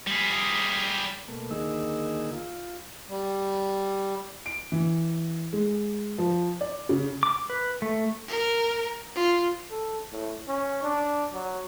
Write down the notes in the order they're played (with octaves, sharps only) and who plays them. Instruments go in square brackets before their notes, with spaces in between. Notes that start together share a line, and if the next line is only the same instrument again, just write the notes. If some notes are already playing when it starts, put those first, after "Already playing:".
[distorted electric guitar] G3 G#4
[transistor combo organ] B2 A3 A#3
D2 D#3 A#3 D#4 G#4 E6
F4
[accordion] G3
[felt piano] D7
E3
G#3
F3
D5
C#3
[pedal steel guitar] D6
B4
A3
[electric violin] A#4
F4
[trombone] A4
A2
C#4
D4
F#3